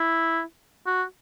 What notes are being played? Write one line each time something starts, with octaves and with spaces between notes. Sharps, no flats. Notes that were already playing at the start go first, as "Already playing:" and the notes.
Already playing: E4
F#4